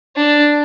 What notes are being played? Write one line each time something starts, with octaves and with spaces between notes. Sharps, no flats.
D4